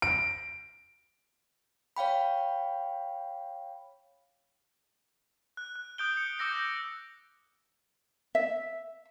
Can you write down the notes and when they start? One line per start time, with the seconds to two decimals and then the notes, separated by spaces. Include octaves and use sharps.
0.02 D7
1.96 C#5 F5 G5 B5
5.57 F#6
5.76 F#6
5.98 D#6 F#6 G6 D7 G7
6.13 G6 C#7
6.39 D6 E6 A#6 C#7
6.52 G6
8.35 E5